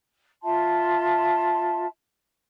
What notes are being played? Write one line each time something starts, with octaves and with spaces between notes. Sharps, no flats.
F4 E5 A5 C6